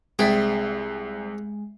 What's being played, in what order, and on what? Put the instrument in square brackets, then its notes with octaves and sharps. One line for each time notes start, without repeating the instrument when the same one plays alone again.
[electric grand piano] C2 C4 [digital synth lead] G#3 [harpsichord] G#4 [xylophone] D5 E5 G5